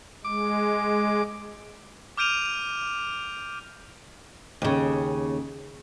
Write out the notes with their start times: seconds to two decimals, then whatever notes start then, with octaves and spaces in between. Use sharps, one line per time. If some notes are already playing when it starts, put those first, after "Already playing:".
0.25 G#3 D6
2.17 D6 F6 G6 D7 D#7 F7
4.62 D#2 C#3